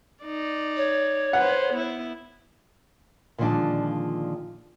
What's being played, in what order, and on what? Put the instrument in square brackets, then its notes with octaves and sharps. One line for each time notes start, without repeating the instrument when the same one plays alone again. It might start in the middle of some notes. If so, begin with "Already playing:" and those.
[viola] D#4 D5
[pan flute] C#5
[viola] B4 C5 [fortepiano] F#5
[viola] B3 E4
[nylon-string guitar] A#2 D3 D#3 F3 G#3 D4